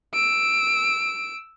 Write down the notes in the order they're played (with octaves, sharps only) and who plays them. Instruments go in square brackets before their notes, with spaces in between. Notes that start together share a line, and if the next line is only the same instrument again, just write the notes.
[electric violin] E6 D7